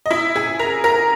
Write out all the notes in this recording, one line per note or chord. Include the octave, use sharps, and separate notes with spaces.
D#5
E4 E5
G#4 G#5
A#4 A#5
A#4 A#5